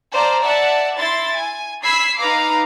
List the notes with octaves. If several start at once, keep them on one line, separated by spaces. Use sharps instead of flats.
C5 D5 F5 A5 A#5
D5 E5 F#5 A5
E4 C6 A6
G#5
B5 E6 G#6 B6 C7
D#4 B4 F5 A#5 D6